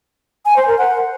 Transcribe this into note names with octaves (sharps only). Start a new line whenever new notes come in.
G#5
C5
A#4
F#5